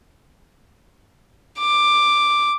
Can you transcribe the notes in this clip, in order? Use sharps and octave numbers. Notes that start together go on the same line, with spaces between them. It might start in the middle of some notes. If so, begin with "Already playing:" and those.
D6